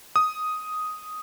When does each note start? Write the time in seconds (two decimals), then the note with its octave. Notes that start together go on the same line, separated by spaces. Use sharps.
0.16 D#6